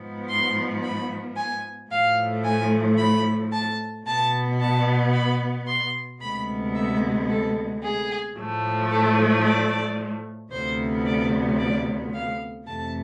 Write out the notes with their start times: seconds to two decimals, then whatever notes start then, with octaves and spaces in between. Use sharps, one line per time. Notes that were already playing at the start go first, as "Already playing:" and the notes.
Already playing: G#2 F3 B3
0.29 C6
0.83 B5
1.36 G#5
1.91 A2 F3 A3 F5
2.44 G#5
2.97 B5
3.51 A5
4.05 B2 B3 A5
4.59 A5
5.13 B5
5.67 C6
6.20 D2 C3 G#3 B3 B5
6.74 E5
7.28 A4
7.82 G#4
8.35 A2 F3 A3
8.90 A4
9.44 D5
10.51 D2 C3 F3 B3 C5
11.05 D5
11.58 D5
12.13 F5
12.66 F2 C3 E3 A3 A5